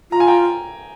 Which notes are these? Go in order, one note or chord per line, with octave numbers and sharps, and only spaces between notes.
F4 A#5
G#5
G5 A#5